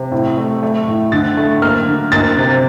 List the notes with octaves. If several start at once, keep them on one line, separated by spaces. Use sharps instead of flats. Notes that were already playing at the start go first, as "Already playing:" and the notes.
Already playing: C3
A2
A3
A3
A2
D3 A6
A3
A#3 F6
D3
A#3 A6
C3